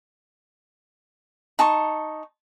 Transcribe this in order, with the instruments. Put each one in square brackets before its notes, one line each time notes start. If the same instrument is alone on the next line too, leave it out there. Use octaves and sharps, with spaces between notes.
[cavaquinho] D#4 A5 C6 C#6